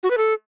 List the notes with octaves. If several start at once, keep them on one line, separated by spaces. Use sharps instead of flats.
F#4
B4
A4